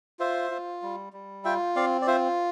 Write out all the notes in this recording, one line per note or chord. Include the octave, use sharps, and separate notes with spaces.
F4 C5 E5
F4
G3
G3
F4 E5 G5
C4 D5 F5
D5
F4 C5 E5